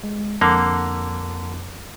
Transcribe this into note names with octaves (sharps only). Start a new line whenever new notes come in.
G#3
F2 D3 A#3